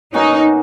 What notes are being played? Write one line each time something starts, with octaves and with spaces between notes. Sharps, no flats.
B2 A#3 C#4 D#4 F#4